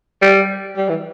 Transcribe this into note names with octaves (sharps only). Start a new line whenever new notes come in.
G3
G3
E3